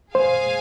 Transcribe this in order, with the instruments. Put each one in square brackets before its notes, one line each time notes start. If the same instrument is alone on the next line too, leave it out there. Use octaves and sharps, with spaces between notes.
[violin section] G#4 F5 G#5 [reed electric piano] C5